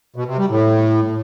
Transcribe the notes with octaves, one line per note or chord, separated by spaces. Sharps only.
B2
C3
G3
A2